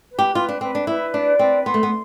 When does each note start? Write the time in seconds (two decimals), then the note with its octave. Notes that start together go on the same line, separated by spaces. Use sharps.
0.10 B4
0.19 G4
0.35 F4 B4
0.49 D4
0.61 C4 B4
0.75 D4
0.87 E4 B4
1.14 D4 D5
1.39 C4 B4
1.66 B3 C6
1.74 A3
1.83 B3